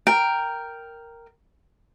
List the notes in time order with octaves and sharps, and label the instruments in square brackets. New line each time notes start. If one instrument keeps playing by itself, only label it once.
[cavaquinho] A#4 G5